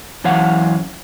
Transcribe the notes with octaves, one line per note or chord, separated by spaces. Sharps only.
F#2 E3 C#5 F5 F#5